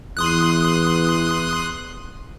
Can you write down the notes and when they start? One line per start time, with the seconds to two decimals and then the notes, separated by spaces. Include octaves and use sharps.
0.17 E2 C6 D#6 F#6